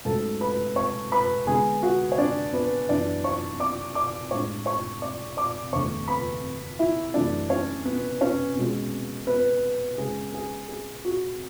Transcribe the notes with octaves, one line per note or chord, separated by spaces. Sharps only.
G#2 F#3 A3 C#4 A4 A5
B4 B5
C#5 C#6
B4 B5
D3 G#3 B3 G#4 G#5
F#4 F#5
C#5
D4 D5
B3 B4
F#2 E3 B3 D4 D5
C#5 C#6
D5 D6
D5 D6
A2 G#3 D4 C#5 C#6
C#5 C#6
D5 D6
D5 D6
E2 D3 A3 C#5 C#6
B4 B5
E4 E5
F#2 E3 A3 D4 D5
C#4 C#5
B3 B4
C#4 C#5
B2 G#3 C#4
B3 B4
C#3 G#3 C#4 G#4
G#4
G#4
F#4